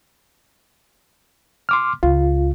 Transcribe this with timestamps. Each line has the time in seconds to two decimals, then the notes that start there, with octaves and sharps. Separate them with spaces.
1.69 C6 D6 F6
2.03 C#2 F4